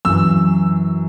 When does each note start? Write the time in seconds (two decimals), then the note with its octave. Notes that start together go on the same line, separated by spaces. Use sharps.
0.05 F#2 E3 E6